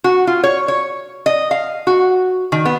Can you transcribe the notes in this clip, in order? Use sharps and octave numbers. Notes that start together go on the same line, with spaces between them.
F#4
F4
C#5
C#5
D#5
F5
F#4
D#3
B3